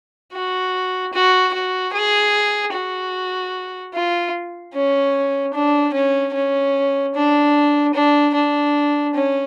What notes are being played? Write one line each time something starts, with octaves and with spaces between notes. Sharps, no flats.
F#4
F#4
F#4
G#4
F#4
F4
C#4
D4
C#4
C#4
D4
D4
D4
C#4